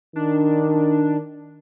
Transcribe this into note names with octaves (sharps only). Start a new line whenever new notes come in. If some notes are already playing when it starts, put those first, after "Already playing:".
D#3 D4